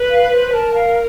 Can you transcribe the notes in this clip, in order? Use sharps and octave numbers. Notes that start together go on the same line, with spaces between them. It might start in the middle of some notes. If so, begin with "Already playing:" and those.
Already playing: B4
F5
C5
A#4 A5
F5